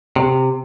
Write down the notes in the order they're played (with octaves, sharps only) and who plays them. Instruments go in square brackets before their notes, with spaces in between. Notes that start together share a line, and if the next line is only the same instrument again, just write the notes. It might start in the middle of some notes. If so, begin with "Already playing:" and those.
[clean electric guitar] C3